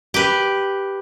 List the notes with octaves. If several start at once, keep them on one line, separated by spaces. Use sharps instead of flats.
G4 B4